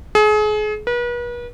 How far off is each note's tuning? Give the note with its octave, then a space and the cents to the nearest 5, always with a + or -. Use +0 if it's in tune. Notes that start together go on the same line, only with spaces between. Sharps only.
G#4 +35
B4 -40